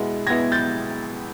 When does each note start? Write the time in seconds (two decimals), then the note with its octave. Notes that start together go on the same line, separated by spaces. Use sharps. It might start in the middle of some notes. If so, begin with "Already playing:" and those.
Already playing: B2 G#3 B3 E4
0.26 B2 G#3 B3 E4 G#6 A#6
0.52 G6 A6